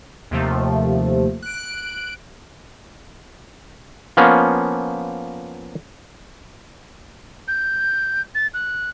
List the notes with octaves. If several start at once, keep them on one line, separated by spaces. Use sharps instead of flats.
D#2 C3 F3 A3
F#6 D7
F3 A#3 B3 C#4
G6
A6
F#6